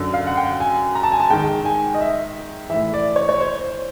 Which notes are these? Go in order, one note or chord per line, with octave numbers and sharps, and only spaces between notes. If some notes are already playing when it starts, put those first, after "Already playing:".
Already playing: F#2 D3
F5
F#5
G5
G#5
A#5
A5
G#5
A5
G#2 D#3 G5
G#5
D#5
E5
A2 E3 E5
D5
C#5
C#5
C5